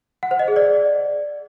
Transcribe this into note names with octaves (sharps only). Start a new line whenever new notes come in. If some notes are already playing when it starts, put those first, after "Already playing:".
F#5
C5
D#5
G#4
D5